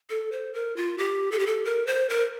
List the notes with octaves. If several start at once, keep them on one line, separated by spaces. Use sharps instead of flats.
A4
C5
A#4
F4
G4
A4
G4
A4
A#4
C5
A#4